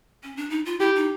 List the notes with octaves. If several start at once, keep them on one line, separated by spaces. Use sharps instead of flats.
C#4
D4
D#4
F4
E4 G4
D#4